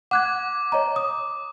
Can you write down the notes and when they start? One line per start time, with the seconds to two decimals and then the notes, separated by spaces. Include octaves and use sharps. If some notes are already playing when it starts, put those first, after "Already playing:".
0.11 F#5 D6 F#6 G#6
0.72 C#5 D#5 A#5
0.96 D#6